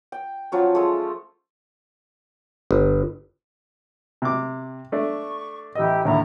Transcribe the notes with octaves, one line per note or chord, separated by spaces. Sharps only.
G5
F3 F#3 C#4
G#3 A3
G1
C3 D6
A3 D4 C#6
A1 E4 G4 D#5 E6
D#2 A2 D3 E4 A#5 C#6